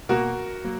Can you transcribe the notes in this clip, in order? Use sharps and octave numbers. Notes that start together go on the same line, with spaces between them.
B2 A#3 F#4 A#4
F#3 A#3